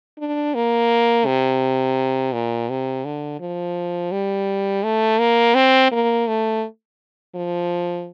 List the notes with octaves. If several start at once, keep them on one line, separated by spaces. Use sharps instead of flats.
D4
A#3
C3
A#2
C3
D3
F3
G3
A3
A#3
C4
A#3
A3
F3